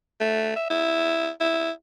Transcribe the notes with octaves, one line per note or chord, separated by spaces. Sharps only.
A3
E5
E4
E4